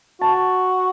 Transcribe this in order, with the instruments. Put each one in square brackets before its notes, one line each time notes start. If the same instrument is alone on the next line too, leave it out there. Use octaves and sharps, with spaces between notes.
[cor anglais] F#4 [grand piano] A5